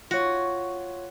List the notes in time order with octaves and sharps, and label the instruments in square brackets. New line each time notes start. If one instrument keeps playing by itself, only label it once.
[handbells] F4 C#5 [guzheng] F#4